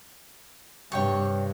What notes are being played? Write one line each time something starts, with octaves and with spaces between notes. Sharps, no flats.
G2 C3 C#5 G5 C#6